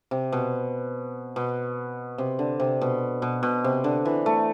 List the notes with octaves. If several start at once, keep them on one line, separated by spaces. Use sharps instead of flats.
C3
B2
B2
C3
D3
C3
B2
B2
B2
C3
D3
E3
A3